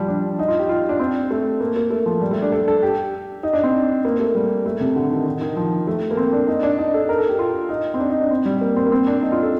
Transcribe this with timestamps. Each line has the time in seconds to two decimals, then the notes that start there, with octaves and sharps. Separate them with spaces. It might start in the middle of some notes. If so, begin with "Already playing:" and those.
Already playing: F3 G3
0.08 D4
0.39 D#4
0.48 F4
0.59 G4
0.69 F4
0.89 D4
0.99 C4
1.31 A3
1.61 A#3
1.76 A#3
1.90 A3
2.06 F3
2.21 G3
2.31 A3
2.42 D4
2.52 A4
2.68 A4
2.83 G4
3.43 D#4
3.53 D4
3.63 C4
4.05 A#3
4.20 A3
4.35 G3
4.66 A3
4.80 C3
4.96 D3
5.11 D#3
5.26 D#3
5.41 D#3
5.57 F3
5.87 A3
6.11 A#3
6.17 C4
6.33 D4
6.48 D#4
6.63 D4
6.79 D#4
6.94 A4
7.09 A#4
7.18 A4
7.29 G4
7.39 F4
7.69 D#4
7.94 C4
8.00 D4
8.10 D#4
8.21 D4
8.31 C4
8.45 G3
8.61 A#3
8.76 C4
8.87 A#3
8.92 C4
9.07 D4
9.22 D#4
9.32 F4
9.43 A4